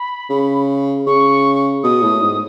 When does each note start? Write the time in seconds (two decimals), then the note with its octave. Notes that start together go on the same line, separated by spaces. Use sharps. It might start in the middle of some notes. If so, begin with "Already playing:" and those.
Already playing: B5
0.30 C#3
1.07 C#3 C#6
1.84 B2 D#6
2.03 A2
2.22 G#2